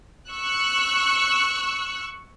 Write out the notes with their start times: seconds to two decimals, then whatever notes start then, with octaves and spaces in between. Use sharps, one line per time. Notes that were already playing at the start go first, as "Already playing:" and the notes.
0.30 C#6 E6 F#6